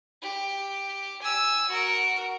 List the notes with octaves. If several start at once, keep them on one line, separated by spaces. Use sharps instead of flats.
G4
G#5 E6
F#4 A#4